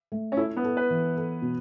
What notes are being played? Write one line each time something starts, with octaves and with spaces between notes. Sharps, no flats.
A3
C#4
E4 A4
B3
A4
B4
E3
A4
B2